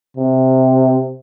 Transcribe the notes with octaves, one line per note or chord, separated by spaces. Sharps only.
C3